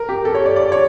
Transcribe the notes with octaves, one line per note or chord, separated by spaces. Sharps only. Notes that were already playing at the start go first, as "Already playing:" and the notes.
Already playing: A#4
G4
A4
C#5
D5
D5
C#5